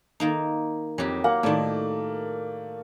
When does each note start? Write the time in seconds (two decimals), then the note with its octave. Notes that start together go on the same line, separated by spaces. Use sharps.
0.20 D#3 A#3 D#4
0.98 F2 F#3 G4
1.24 A#3 F#5
1.43 A2 D#3 A3 D5 A5